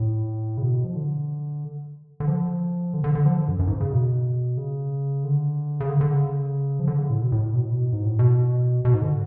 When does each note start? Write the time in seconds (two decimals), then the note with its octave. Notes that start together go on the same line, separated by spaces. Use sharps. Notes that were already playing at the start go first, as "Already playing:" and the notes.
Already playing: A2
0.57 C#3
0.62 B2
0.84 F3
0.95 D3
2.20 D3
2.28 F3
2.94 D3
3.04 D3
3.15 D3
3.26 F3
3.37 D3
3.48 F#2
3.59 F#2
3.67 G#2
3.80 C#3
3.92 B2
4.57 C#3
5.24 D3
5.80 C#3
5.89 D3
6.01 D3
6.11 C#3
6.79 F3
6.87 D3
6.98 C#3
7.10 A2
7.21 B2
7.32 A2
7.53 B2
7.62 A2
7.70 B2
7.92 G#2
8.05 A2
8.19 B2
8.85 B2
8.94 G#2
9.02 D3